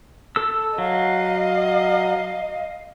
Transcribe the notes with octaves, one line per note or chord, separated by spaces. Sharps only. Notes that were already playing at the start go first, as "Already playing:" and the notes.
A4 E6
F#3 D#5 F5